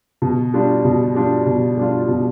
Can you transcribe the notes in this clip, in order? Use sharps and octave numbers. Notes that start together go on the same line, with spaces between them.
B2
G3 D4 F4
B2
G3 D4 F4
B2
G3 D4 F4
B2